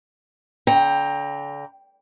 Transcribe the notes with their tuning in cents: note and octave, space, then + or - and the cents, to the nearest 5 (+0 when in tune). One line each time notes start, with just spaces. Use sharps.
D3 -35 G5 +15 A#5 +0